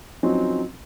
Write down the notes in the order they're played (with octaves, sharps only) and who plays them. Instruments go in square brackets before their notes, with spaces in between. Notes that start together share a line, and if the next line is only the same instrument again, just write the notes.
[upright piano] F3 F#3 C4 C#4 D#4 F#4